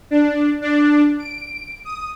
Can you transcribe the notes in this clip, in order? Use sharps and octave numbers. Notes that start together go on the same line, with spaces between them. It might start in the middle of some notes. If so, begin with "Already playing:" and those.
D4
D4
D7
D#6